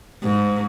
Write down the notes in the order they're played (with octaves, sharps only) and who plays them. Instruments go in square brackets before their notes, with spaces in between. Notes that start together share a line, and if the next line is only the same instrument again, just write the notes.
[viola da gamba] G#2